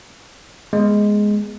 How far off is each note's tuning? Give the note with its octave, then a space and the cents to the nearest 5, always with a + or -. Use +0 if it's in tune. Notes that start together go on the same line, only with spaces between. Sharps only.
G#3 +0 B3 -20